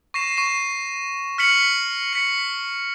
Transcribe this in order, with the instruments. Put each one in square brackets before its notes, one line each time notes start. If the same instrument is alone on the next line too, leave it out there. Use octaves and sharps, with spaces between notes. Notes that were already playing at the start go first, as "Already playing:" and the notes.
[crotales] C#6 A#6 C7 E7
C#6 C7 E7
F6 B6 C#7 F#7
B6 C#7